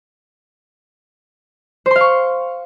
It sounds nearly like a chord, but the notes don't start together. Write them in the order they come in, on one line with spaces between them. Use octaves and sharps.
C5 C6 F5 C#6